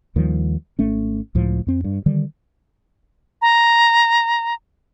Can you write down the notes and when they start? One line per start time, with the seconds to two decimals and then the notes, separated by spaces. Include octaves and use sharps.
0.16 D#2 D#3 F3 G3
0.79 G#1 A3 C#4
1.35 C#2 A2 F3
1.67 F2 C4
1.84 G2
2.06 D3 D#3 G3
3.42 A#5